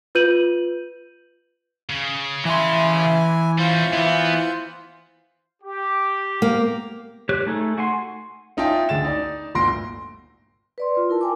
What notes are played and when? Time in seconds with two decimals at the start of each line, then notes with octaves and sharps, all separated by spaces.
0.15 F4 B4 G6 D#7 F#7
1.90 C#3
2.45 E3 E4 G#5 C6
3.58 G3 C#4 F4 C5
3.93 E3 B3 E4
5.62 G4
6.42 A#3
7.29 G4 C#5 F#6
7.47 A3 D#4 G#4 A4
7.78 F#4 F#5 G#5 C6
8.57 C#4 D#4 F4 E5 G5 A5
8.89 D2 D3 G#4 A6 E7
9.04 D#4 D5
9.55 G1 D2 A#2 C6 A#6 D7
10.78 B4 D5 C6
10.97 F4
11.09 E4 A#4 A5
11.21 G5 G#5 D6